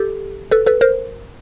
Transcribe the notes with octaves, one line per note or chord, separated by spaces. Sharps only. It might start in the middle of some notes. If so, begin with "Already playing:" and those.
Already playing: G4 A4
A4 B4
A4 B4
A#4 C5